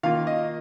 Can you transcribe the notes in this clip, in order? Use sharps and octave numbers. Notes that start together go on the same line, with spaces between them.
D#3 A#3 F4 F5
D#5